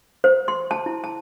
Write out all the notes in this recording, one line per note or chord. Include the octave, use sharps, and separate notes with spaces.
C5
C6
A5
E4
A5